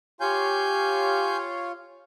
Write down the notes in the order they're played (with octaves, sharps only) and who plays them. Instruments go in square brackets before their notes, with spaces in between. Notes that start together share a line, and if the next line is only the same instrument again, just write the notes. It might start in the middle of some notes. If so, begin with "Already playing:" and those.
[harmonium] F4 C#5 F5 [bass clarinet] G4 [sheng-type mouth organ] G#5 G6